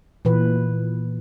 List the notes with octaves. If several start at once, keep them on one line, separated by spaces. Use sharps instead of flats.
A#2 E3 B4